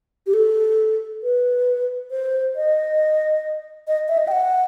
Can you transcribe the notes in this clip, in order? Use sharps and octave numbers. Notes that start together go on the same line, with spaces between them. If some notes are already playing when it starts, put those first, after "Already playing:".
G4
A4
B4
C5
D#5
D#5
E5
D#5
G5
F#5